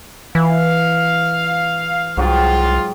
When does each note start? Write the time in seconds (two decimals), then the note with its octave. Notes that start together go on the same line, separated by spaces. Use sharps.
0.35 E3 F5
2.17 C2 G#2 F#3 F4 G5